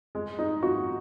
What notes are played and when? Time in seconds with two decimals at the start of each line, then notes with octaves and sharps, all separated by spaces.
0.15 G#3
0.39 D#4
0.63 F#4